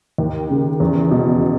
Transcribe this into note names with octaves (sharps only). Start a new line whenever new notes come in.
D#2
C#3
E2
B2